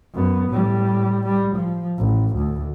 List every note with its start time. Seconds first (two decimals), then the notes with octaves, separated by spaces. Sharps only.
0.14 F#2 B3
0.49 A2 G3
1.26 G3
1.56 F3
1.99 A1
2.36 D2